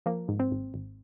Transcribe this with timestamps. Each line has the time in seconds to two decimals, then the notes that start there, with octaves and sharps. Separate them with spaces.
0.06 F3 A#3
0.28 G#2
0.39 C4
0.52 G#1
0.74 G#1